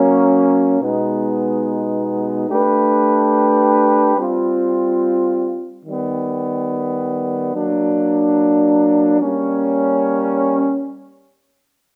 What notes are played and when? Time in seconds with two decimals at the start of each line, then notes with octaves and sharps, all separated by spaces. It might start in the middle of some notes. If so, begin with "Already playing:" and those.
Already playing: F#3 A#3 C#4
0.80 B2 G#3 B3 D#4
2.48 A3 D4 G4 B4
4.17 G3 C4 F4
5.85 D#3 G3 B3
7.53 F#3 A#3 D4
9.21 G3 A#3 C#4